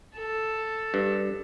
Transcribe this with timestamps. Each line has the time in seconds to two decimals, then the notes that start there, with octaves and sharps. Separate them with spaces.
0.17 A4
0.94 G2